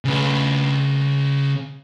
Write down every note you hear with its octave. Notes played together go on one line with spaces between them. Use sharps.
C#3 B4